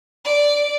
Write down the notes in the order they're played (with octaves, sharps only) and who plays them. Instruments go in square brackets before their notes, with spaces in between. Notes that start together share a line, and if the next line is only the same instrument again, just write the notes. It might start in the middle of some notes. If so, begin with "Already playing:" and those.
[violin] D5